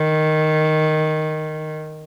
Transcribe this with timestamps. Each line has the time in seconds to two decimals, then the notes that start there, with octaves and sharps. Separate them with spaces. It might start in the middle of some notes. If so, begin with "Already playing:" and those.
Already playing: D#3